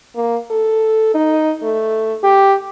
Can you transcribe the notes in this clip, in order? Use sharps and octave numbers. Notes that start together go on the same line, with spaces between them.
A#3
A4
D#4
A3
G4